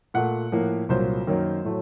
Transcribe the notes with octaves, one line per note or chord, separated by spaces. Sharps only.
A#2 A3 F#5
A2 F3 A#3
C2 A#2 F#3 C5
F#2 D#3 F#3 A#3
A2 F#3 A3